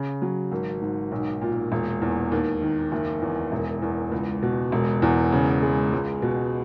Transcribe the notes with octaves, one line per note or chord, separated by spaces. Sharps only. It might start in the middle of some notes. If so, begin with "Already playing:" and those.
Already playing: C#3
F#3
G#1
G#2
B1
A#2
E1
E2
D#2
D#3
F#1
E2
E1
E2
C#2
B2
E1
E2
C#3
G#3
C#2
B2